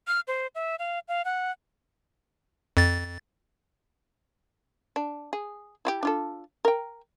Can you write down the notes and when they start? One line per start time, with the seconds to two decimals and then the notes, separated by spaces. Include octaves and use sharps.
0.07 F6
0.28 C5
0.55 E5
0.79 F5
1.08 F5
1.25 F#5
2.77 F2 A6
4.96 D4
5.33 G#4
5.85 E4 F#4 G4
6.03 D4 F4 A4
6.65 A#4 G5